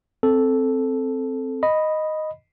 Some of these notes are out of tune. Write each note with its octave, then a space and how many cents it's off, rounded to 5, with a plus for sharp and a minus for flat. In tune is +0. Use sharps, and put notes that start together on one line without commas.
C4 +0 A4 -5
D#5 +0 B5 +0